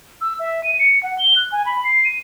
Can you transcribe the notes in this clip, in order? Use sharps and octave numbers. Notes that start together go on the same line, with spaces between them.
E6
E5
D#7
C#7
F#5
G7
F#6
G#5
B5
C7
D#7